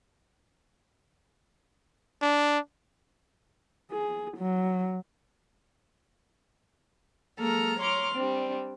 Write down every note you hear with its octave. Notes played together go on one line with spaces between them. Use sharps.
D4
G#4
F#3
F#3 G#3 A#3 A4 A#5 F6
C#5 A#5 C6 D6 F6
G3 C4 D4